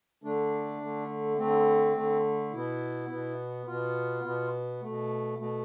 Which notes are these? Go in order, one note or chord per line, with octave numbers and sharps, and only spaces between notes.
D3 A3 D4
D3 A3
D3 A3 C4
D3 A3
B2 B3 E4
B2 B3
B2 B3 F4
B2 B3
B2 A3
B2 A3